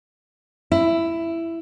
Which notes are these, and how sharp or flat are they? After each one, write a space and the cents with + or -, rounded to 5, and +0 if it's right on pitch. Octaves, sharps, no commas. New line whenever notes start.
E4 +10